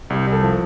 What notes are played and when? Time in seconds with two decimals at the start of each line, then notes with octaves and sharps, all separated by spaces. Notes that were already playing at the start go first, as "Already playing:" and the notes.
0.10 C2 G4
0.27 C2
0.32 A4
0.43 F3